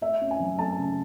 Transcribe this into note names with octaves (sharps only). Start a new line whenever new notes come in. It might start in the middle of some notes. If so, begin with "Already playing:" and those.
A3 E5
C#4
G#5
F#3
A3 A5
C#3